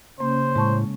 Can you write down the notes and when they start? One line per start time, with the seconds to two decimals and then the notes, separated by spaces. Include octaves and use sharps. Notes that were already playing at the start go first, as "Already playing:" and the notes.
0.20 C#3 A#3 C#4 C5
0.56 A2 G#3 A5 C#6